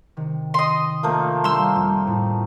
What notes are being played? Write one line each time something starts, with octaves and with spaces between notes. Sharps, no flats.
C3 D#3
D#5 C6
F3 A3 A#3
G3 D4 G4 C6 E6
F2
A2